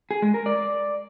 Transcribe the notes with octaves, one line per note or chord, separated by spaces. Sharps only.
G#4
G#3
A#4
D5